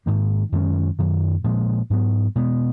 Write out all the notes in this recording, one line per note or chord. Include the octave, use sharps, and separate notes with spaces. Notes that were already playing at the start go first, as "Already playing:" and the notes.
G#2 D#3 A#3
F#2 D#3 G#3 C#4
F#2 D#3 F#3
A#2 F3 G#3
G#2 F#3 B3
B2 G#3 B3